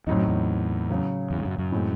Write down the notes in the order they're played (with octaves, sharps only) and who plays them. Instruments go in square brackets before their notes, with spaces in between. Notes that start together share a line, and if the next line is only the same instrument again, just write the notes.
[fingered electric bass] E2 [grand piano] A2 F#3 C4 D#4
[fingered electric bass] F#2
E2
[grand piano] C#3 F#3 C#4
[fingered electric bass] E2
G#2
F#2
F#2
[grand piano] A2 E3 G#3 C4